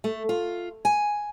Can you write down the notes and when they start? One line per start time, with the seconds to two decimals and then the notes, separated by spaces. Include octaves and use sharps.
0.04 A3
0.29 F4
0.85 G#5